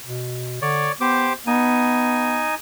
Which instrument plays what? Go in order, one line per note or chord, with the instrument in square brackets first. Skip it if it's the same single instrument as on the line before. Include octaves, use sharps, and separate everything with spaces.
[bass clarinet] B2
[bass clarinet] D3 [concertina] C#5 D5
[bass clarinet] B3 [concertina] G4 C5 D6
[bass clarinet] B3 [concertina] D#4 G#5